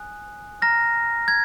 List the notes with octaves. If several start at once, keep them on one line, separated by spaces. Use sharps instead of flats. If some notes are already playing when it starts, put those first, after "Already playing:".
Already playing: G#5 D#6 F#6
A#5 F6 A#6
G#6